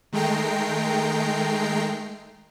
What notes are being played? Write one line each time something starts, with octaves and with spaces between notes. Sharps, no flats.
D#3 G#3 A3 G5 A#5 C7